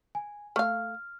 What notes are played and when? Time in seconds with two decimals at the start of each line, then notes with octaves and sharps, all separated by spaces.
0.15 G#5
0.56 A3 F5 F6